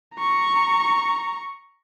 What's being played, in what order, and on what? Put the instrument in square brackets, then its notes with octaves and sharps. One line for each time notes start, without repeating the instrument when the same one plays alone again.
[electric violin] A#5 C#6